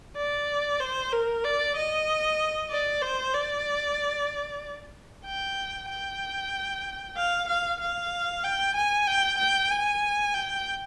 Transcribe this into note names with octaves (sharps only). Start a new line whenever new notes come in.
D5
C5
A#4
D5
D#5
D5
C5
D5
G5
G5
F5
F5
F5
G5
G#5
G5
G5
G#5
G5